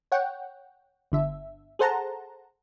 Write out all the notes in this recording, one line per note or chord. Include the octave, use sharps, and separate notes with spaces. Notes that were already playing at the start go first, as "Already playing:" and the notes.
C#5 F#5 G5
G1 D3 E5
G#4 A4 C5 F#5 A5 A#5